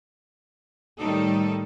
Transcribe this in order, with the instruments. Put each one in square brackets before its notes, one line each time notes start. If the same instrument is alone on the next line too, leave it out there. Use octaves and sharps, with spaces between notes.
[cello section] A2 D#3 G3 D#4 A4